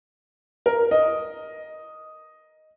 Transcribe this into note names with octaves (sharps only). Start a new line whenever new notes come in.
A#4
D#5